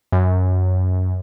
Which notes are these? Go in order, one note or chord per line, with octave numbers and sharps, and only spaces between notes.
F#2